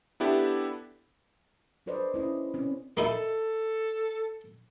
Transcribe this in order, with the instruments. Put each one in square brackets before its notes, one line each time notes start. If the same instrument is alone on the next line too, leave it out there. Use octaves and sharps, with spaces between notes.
[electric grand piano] B3 D4 E4 G4 A4
[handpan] D4 A4 B4 C5 D5 D#5
C#4 E4 D#5
C4 C#4
[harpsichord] A#3 D#4 E4 [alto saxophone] A4